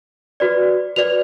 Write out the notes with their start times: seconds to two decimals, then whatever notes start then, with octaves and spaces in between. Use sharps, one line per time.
0.40 F#4 B4 D5
0.96 F#4 B4 D5 F7